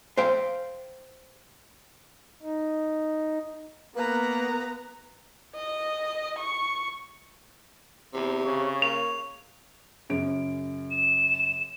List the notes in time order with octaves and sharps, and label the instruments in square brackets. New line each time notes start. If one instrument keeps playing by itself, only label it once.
[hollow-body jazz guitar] C5 F5 G5
[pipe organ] D#4
[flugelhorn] A#3 [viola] B3 A#5 [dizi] B4
[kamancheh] D#5
C#6
[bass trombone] E2 [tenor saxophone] C3
[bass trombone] C#3 [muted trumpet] C#5
[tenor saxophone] A#3 [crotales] F7
[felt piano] F#2 C#3 D7
[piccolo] E7